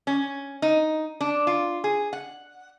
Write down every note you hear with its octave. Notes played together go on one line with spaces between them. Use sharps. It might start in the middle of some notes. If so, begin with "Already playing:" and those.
C#4
D#4
D4
F4
G#4
F#5